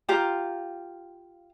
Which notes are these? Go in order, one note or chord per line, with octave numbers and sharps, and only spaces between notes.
F4 G4 F5 A#5